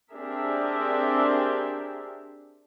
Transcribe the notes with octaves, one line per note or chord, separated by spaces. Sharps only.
C4 D4 G4 G#4 A#4 E5